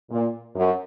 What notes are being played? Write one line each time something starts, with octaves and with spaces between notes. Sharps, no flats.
A#2
F#2